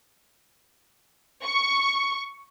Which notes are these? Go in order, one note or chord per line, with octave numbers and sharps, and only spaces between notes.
C#6